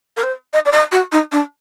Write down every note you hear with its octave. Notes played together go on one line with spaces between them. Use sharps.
A#4
C5
D#5
D5
D#5
F#4
D#4
D4